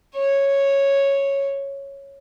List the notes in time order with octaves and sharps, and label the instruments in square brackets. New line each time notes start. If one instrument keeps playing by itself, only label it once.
[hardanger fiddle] C#5